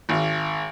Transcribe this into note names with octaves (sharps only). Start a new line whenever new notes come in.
G#1